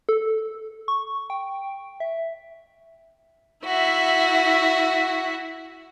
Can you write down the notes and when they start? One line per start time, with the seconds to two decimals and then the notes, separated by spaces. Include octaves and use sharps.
0.09 A4
0.88 C#6
1.30 G5
2.00 E5
3.65 E4 F#4 E5